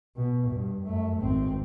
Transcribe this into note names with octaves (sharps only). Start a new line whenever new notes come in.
B2
G2
F#2 A3
G#1 C4